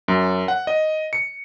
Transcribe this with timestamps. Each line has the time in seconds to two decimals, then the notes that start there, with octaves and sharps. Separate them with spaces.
0.08 F#2
0.48 F#5
0.67 D#5
1.13 C#7